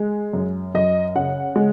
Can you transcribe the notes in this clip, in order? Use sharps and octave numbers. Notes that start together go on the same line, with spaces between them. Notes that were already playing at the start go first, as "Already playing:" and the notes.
Already playing: G#3
F#2
F#2 D#5
C#3 F#5
G#3